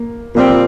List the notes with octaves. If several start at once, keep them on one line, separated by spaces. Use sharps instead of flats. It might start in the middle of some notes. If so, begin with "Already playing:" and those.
Already playing: A#3
A#2 F3 G3 A#3 C4
F3